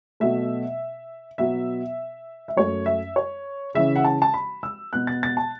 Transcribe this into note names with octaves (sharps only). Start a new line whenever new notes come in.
B2 F#3 A3 E5
B2 F#3 B3 E5
E5
F#2 F#3 A3 C#4 C#5
E5
C#5
C#3 E3 C#4 E5
F#5
A5
A5
B5
E6
B2 B3 F#6
A6
A6
A5